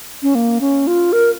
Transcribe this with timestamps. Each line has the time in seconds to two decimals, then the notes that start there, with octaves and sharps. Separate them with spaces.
0.23 C#4
0.35 A#3
0.61 C#4
0.87 F4
1.13 A#4